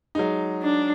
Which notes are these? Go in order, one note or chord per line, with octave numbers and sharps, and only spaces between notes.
F#3 G#3 D#4
D4